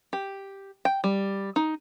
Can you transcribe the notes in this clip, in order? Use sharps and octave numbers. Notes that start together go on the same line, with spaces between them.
G4
G5
G3
D#4